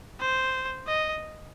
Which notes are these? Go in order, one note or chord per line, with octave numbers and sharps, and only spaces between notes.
C5
D#5